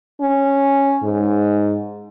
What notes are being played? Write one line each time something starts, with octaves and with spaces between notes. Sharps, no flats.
C#4
G#2